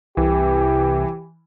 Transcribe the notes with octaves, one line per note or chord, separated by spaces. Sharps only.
C2 E3 G4